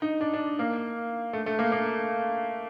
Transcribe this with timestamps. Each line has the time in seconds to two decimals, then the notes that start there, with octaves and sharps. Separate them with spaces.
0.02 D#4
0.21 D4
0.33 D4
0.59 A#3
1.33 A3
1.46 A3
1.59 A#3
1.72 A#3